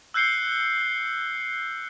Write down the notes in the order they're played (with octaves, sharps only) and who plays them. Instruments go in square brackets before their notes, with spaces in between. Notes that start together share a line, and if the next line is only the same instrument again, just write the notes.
[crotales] E6 F#6 G6 C7 C#7 G7